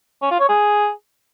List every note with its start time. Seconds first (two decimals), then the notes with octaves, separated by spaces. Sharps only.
0.22 C#4
0.31 F4
0.40 C#5
0.49 G#4